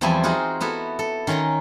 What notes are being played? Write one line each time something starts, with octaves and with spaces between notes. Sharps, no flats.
E2 F3 G3 C4 E4 G#5
D#4 F4 F#4 G#4 F#5
B3 E4 F#4 A4
A4
D#3 C#4 C#5 A#5 C6